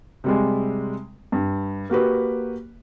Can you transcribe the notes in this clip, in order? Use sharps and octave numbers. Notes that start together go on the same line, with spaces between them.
C3 G3 G#3
G2
A#3 F#4 G4 B4